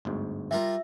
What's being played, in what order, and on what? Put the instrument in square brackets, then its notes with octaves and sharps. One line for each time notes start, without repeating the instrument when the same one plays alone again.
[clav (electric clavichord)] G1 D2 G#2
[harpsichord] G3 F4 A#4 [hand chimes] E5